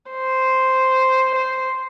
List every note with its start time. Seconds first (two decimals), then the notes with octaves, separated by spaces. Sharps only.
0.11 C5
1.35 C5